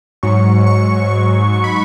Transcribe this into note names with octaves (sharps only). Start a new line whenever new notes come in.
G#2 F#3 C#6
C#6
C#6
C#6
B5